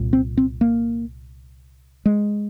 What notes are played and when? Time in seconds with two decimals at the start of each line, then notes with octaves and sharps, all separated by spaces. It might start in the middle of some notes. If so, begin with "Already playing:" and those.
Already playing: C2 A#2
0.13 C4
0.37 C4
0.61 A#3
2.06 G#3